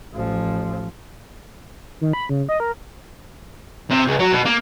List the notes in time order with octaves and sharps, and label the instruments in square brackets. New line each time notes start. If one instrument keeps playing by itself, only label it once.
[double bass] A1 F3
[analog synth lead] D#3
B5
C#3
D#5
A#4
[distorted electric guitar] C3
C#2
F#3
B2
A#3